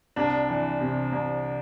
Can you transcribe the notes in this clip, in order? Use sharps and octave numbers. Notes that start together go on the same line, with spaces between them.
C2 D4
E3
C3
C2